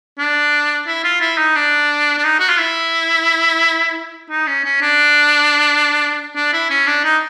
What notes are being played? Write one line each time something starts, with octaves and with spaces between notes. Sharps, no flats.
D4
E4
F4
E4
D#4
D4
D4
D#4
F#4
F4
E4
D#4
C#4
C#4
D4
D4
E4
C#4
D4
D#4